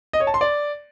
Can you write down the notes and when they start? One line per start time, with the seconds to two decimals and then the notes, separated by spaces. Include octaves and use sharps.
0.13 D#5
0.20 C#5
0.27 A5
0.34 C6
0.41 D5